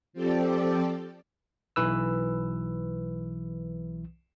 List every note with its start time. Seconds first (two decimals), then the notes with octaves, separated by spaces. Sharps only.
0.13 F3 C4 G4 A4 D5
1.76 B1 E3 B4 E6